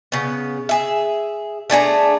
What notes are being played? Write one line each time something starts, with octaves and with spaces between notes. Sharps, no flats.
C#3 B3
G#4 E5
A3 D4 G#4 A#5